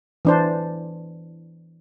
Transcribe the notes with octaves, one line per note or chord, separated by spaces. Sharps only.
E3 D4 C5